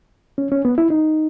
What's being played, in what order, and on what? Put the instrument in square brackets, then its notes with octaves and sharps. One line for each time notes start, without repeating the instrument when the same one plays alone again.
[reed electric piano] C#4
C#4
B3
E4
D#4